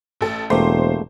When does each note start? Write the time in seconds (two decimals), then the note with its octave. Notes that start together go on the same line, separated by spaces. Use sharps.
0.21 A1 A4
0.50 E1 A3 A#3 G4 C5